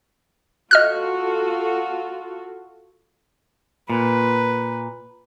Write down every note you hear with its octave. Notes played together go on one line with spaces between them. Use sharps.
F4 F#4 A4 D#5 F6 F#6
A#2 B4